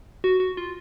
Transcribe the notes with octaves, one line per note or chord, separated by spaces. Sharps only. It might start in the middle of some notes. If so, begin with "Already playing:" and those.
F#4
F#4
F4